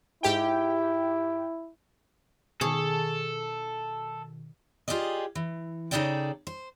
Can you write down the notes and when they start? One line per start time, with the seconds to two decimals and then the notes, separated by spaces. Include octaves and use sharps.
0.23 G#2 E4 G4 G5
2.61 B2 D#3 G#4 A4 C#5
4.88 F4 G4 G#4 D5 D#5
5.35 E3
5.91 C#3 D#4 G#4 A4 D5 G5
6.47 C5